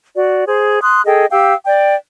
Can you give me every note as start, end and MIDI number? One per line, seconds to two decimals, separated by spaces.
0.16 0.44 66
0.16 0.44 74
0.46 0.81 68
0.46 0.81 72
0.82 1.01 84
0.82 1.01 87
0.82 1.01 90
1.05 1.25 68
1.05 1.25 69
1.05 1.25 75
1.05 1.25 79
1.31 1.53 67
1.31 1.53 77
1.31 1.53 79
1.31 1.53 88
1.64 1.94 74
1.64 1.94 79